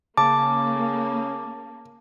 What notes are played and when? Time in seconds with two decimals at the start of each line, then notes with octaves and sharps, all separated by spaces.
0.17 C#3 A#3 A5 D6